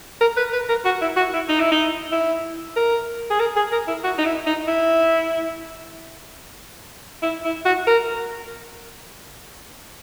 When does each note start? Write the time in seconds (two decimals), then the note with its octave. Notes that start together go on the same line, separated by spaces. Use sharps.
0.21 A#4
0.37 B4
0.53 B4
0.69 A#4
0.85 F#4
1.01 E4
1.17 F#4
1.33 E4
1.49 D#4
1.60 E4
1.71 D#4
2.12 E4
2.76 A#4
3.30 G#4
3.40 A#4
3.56 G#4
3.72 A#4
3.88 E4
4.04 F#4
4.18 D#4
4.25 E4
4.46 D#4
4.68 E4
7.22 E4
7.44 E4
7.65 F#4
7.87 A#4